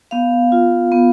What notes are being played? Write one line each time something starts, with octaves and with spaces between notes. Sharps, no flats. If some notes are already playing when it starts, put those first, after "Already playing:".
B3 F5
F4
B3